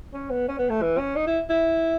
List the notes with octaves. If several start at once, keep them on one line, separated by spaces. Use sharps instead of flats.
C#4
B3
C#4
B3
A3
E3
C#4
D#4
E4
E4